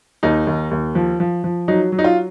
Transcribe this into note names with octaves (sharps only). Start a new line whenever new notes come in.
D#2 D#4
D#2
D#2
F3
F3
F3
F#3 D#4
F#3
D#4
F4